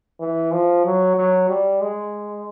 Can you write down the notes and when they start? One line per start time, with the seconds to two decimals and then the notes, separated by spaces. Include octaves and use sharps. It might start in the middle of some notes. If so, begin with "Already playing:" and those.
0.20 E3
0.52 F3
0.85 F#3
1.16 F#3
1.49 G3
1.81 G#3